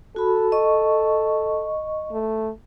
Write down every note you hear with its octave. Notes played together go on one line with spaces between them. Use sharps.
F#4 A4 B5
D#5 C#6
A3